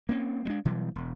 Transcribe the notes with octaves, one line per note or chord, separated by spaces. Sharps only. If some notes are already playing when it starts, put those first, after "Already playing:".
A#3 C4 C#4
G3 G#3 D4
B2 E3 F#3 G3
E1